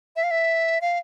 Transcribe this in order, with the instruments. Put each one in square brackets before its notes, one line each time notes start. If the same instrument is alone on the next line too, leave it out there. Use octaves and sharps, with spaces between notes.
[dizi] E5
F5
E5
F5